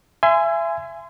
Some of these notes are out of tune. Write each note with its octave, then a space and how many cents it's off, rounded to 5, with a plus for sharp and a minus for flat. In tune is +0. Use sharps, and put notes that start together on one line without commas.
E5 +30 G#5 +0 C6 -30